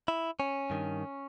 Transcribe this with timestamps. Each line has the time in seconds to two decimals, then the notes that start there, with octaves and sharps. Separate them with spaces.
0.08 E4
0.40 C#4
0.70 G2 D#3